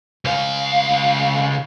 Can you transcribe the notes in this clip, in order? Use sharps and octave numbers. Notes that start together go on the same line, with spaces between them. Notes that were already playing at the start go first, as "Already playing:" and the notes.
C#2 F5